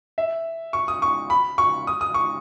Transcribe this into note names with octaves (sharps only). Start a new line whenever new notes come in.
E5
C#6
D#6
C#6
B5
C#6
D#6
D#6
C#6